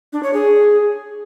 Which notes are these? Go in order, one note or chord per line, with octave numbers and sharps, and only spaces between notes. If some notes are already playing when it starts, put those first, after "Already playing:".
D4
C#5
G#4